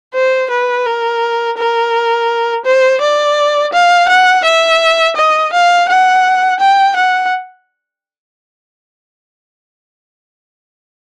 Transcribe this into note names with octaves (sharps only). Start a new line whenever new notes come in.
C5
B4
A#4
A#4
C5
D5
F5
F#5
E5
D#5
F5
F#5
G5
F#5